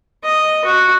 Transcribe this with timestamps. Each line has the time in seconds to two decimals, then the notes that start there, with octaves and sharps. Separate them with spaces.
0.25 D#5
0.65 F#4